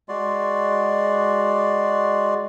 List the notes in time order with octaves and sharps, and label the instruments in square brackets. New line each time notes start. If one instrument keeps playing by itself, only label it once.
[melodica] G#3 F#4 D5 C6